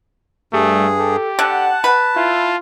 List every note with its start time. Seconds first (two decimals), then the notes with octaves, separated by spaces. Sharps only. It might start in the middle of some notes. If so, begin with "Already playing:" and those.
0.53 G2 G3 A3 G#4
0.99 G4 A4
1.39 D3 F#5 A5
1.84 B4
2.16 E4 F4